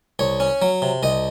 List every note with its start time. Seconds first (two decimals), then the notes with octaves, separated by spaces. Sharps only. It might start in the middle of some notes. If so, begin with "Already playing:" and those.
0.19 C2 C#5
0.40 C#4
0.62 F#3
0.82 C3
1.03 C2 D#5